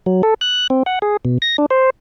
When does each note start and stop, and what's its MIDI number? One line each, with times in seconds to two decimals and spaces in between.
0.06 0.22 54
0.23 0.34 69
0.41 0.67 90
0.70 0.83 60
0.86 0.99 78
1.02 1.17 68
1.25 1.38 47
1.42 1.57 94
1.58 1.66 62
1.70 1.90 72